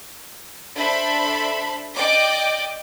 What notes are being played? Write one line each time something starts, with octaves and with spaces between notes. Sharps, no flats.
D4 A4 C5 E5 A5 B5
D5 D#5 G5 D6